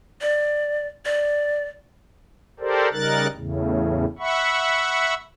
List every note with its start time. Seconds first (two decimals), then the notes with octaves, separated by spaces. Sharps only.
0.21 D5
1.06 D5
2.60 G4 A4 A#4 C5 D5
2.92 C#3 G3 D#4 A#4 F#6 A6
3.35 E2 A2 C#3
4.19 E5 F#5 B5 C#6